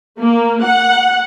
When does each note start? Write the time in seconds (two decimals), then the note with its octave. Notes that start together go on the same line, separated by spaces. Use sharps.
0.20 A#3
0.65 F#5